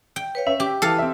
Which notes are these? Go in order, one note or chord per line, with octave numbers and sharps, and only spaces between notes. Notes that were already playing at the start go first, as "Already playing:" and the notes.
G5
B4 C#5 F5
C#4 E5
G4 D6
E3 A4 F5
C4 E5